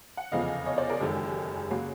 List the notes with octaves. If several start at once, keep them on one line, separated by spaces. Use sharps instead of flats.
F#5
F1 E2 C#3 F3 D#5 F5
C#5 D#5
C5 D5
G#4 A#4
F#1 F#2 D#3 G#3 G4 A4
C#3 F#3 A#3 F#4 G#4